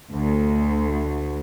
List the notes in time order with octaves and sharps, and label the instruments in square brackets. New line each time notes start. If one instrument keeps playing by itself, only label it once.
[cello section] D2